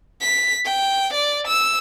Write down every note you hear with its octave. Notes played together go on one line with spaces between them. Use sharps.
B6
G5
D5
E6